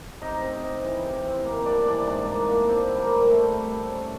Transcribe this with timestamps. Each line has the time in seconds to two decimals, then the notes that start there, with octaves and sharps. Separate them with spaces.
0.21 C3 D#4 D#5
0.42 C4
0.63 C3
0.84 E3
1.04 C3
1.24 C4
1.45 A#3
1.65 G3 D4 D5
1.85 E3 D4 D5
2.07 G#2 D4 D5
2.27 A#3
2.47 A#3
2.68 C3 C4 C5
2.88 G3
2.98 A#3 A#4
3.08 G3
3.30 G3 A3 A4
3.50 G3
3.70 C3
3.91 C#4